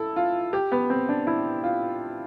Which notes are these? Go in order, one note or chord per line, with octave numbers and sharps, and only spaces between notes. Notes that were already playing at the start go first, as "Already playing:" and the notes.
Already playing: E4 A4
F4
G4
B3
C4
D4
E4
F4